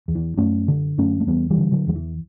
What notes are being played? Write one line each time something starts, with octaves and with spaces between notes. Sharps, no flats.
E2
E3
F#2 A3 C#4
D3
F#2 A3 C#4
A3
E2 G3 B3
E3 G3
D3
D3 F#3
E2 F#3
E3